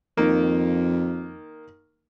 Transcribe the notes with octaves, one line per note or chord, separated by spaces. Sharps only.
F2 D#3 A#3